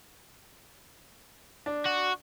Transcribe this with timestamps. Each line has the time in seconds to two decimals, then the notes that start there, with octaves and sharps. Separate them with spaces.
1.66 D4
1.85 F#4